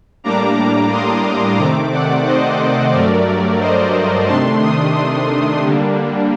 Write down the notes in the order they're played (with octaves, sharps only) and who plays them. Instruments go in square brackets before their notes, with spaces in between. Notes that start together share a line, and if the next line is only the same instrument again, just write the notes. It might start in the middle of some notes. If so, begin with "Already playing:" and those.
[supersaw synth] A2 G3 A#3 D4 A#5 D6
C6 D#6
C3 D#3 A3 C4 A#5 D6
D5 F#5
C5 D#5
G2 F#3 A3 A#4 D5
C5 D#5
C3 D#3 A3 D4 A5 C6
C6 D#6
C6 D#6
D3 G3 A#3 D4